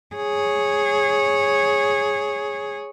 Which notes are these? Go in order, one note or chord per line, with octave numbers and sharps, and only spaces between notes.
G#4 C#5